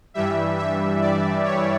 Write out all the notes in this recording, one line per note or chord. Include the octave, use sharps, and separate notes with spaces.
G2 E3 G3 E5
E5
D5
C#5